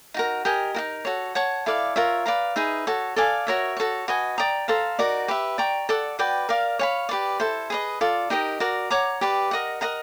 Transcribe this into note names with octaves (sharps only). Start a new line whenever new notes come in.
D#4 F#4 A#4
G4 A#4 D#5 G#5
D#4 F#4 A#4
F#4 A4 C#5
C#5 F#5 A5 C#6
E4 A4 D5 F5
F4 A#4 C#5 E5
B4 D5 F5 A#5
D#4 G#4 B4 E5
F#4 A4 C#5
A4 D5 F5 G#5
F#4 A#4 C#5 E5
F#4 A4 C#5
F#4 B4 D#5 G#5
D5 G5 A#5 D#6
A4 C5 F5 A#5
D#4 F#4 A#4 D5
G4 B4 E5
D5 G5 A#5 C#6
A4 D5 F#5
F#4 B4 D5 G5
A#4 D5 F5
C#5 F5 G#5 B5
G4 B4 D5
E4 A4 C5
G#4 B4 D#5
F4 A4 D5
D#4 G4 A#4 D#5
F#4 A#4 D5
C#5 F#5 A#5 D6
G4 B4 D5
A#4 D#5 F#5
A#4 D#5 F#5 A#5